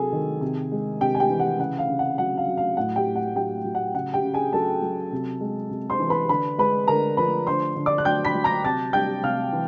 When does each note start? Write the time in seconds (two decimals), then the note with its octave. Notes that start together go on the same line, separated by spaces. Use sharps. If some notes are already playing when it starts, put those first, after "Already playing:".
Already playing: C3 F#3 G#4 A4 G#5
0.13 D#3
0.41 C3
0.72 G#3
1.01 C3 G4 G5
1.15 G#5
1.20 G4 G5
1.30 E3
1.40 F#5
1.59 C#3 F#5
1.78 F5
1.88 C#3
1.99 F#5
2.18 F#3 F#5
2.38 F5
2.47 F#3
2.57 F5
2.77 A2 F#5
2.96 G4 G5
3.06 A2
3.16 F#5
3.36 F#3 G4 G5
3.65 F#3
3.75 F#5
3.95 C#3 F#5
4.14 G4 G5
4.24 C#3
4.34 G#4 G#5
4.53 F#3 A4 A5
4.82 F#3
5.13 C3
5.41 G#3
5.71 C3
5.90 C5 C6
6.00 E3
6.09 B4 B5
6.29 D3 B4 B5
6.58 G#3 B4 B5
6.88 D3 A#4 A#5
7.17 F3 B4 B5
7.47 D3 C5 C6
7.76 D3
7.86 D5 D6
7.98 F#6
8.05 F#3 G5 G6
8.25 B5 B6
8.35 F#3
8.44 A#5 A#6
8.64 C3 A5 A6
8.93 G3 G5 G6
9.23 C3 F5 F6
9.52 E3